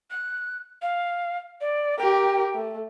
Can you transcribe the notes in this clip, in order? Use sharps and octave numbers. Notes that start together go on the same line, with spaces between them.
F#6
F5
D5
G4 A#4 G5
A3